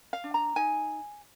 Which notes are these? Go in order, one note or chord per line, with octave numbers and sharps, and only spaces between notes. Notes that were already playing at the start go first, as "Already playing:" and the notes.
F5
D4
A#5
D#4 G#5